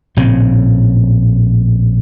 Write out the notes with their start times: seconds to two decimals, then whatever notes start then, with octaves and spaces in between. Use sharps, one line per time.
0.17 A#1 A2 C#3 C4